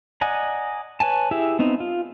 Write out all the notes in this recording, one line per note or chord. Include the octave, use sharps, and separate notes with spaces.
D5 D#5 F#5 G#5 A#5
B4 C#5 G#5 A5
E4 G4 G#4 E5
B3 C4 D#4
F4